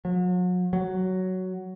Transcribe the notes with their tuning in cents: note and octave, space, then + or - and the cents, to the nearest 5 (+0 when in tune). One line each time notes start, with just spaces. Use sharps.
F#3 -40
F#3 +5